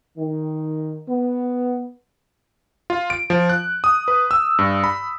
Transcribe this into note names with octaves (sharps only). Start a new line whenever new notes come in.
D#3
B3
F4
D7
F3
F#6
D#6
B4
E6
G2
B5